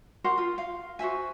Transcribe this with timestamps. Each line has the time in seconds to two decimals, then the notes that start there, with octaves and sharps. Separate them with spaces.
0.24 F#4 A#4 C5 F#5
0.38 F4
0.58 F5
0.99 F#4 C5 E5 G#5